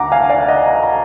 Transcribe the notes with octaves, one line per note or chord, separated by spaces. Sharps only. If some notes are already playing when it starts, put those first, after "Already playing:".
Already playing: D2 F#5 A#5 D6
F5 G#5
D5 F5
D#5 F#5
F#5 A#5
A#5